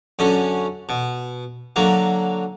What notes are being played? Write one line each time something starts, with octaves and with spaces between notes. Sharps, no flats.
F#2 D3 C#4
B2
D3 F#3 A#3